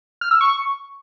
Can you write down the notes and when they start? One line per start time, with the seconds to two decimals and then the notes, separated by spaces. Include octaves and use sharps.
0.21 F6
0.31 E6
0.41 C#6